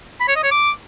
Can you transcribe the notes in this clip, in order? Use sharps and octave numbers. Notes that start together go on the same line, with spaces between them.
B5
C#5
D#5
C#5
D6